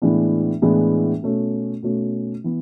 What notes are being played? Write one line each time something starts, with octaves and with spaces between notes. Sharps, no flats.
A2 E3 G#3 B3 D4
A2 E3 G#3 B3 D4
B2 A3 C#4
B2 A3 C#4
E3 B3